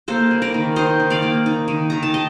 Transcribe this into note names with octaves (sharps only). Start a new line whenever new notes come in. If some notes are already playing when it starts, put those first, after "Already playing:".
A#3 A4 C5
G3
A#4 D5
D#3
D#4 C5 D#5
D#3
D5 F5
A#3
D#4
D#3
D#3 A#5
A5
D#5